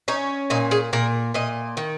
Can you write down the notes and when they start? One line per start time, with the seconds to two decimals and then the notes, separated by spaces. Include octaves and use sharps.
0.08 C#4 D#4
0.50 A#2 D#4
0.71 G#4
0.93 A#2 A#4
1.34 A#2 D#5
1.77 D#3